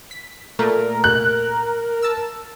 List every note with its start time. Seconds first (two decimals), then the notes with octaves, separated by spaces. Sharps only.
0.11 B6
0.59 A#2 A3 A#4
1.04 F#6
2.02 A5 E6